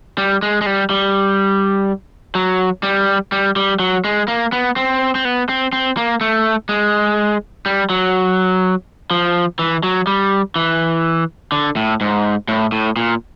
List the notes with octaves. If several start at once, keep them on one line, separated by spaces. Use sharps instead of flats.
G3
G#3
G#3
G3
G3
F#3
G3
G3
G3
F#3
G#3
A#3
B3
C4
C4
B3
C4
C4
A#3
A3
G#3
G3
F#3
F3
E3
F#3
G3
E3
D3
A2
G#2
A2
A2
A#2